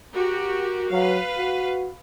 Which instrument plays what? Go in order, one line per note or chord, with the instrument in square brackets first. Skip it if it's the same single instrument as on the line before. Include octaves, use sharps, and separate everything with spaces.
[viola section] F#4 G4 A#4
[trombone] F#3 [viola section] B4 F5
[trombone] F#4